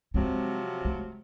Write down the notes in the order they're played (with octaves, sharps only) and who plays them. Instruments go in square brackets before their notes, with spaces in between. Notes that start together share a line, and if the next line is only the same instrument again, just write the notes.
[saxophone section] C3 F3 F#3 [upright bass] G#3 C4
[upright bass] A3